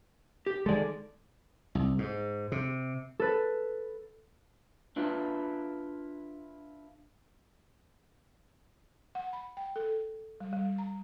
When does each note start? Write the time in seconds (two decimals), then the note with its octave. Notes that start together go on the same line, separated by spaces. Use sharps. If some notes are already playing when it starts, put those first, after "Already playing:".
0.46 G4
0.66 D#3 G#3 A4 D5
1.75 C2
1.98 G#2
2.52 C3
3.19 A4 B4
4.96 D4 E4 F4 B4
9.15 F#5
9.33 B5
9.57 G5
9.76 A4
10.40 G3
10.53 G3
10.78 A#5